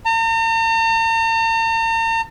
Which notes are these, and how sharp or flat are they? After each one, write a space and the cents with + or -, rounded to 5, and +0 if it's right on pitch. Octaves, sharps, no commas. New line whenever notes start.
A#5 -45